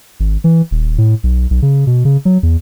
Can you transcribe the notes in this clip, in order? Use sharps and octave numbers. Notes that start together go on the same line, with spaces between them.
G#1
E3
D#1
A2
B1
B1
C#3
B2
C#3
F#3
E2